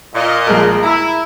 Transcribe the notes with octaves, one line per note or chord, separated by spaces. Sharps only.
A#2 D#5
A#1 G#3 A#4
E4 A#5